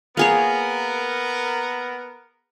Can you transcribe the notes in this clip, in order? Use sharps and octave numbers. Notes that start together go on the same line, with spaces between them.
A#3 B3 G#4 A#4 C#5